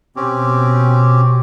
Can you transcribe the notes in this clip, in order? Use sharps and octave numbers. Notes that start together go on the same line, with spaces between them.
B2 C4 C#4 G4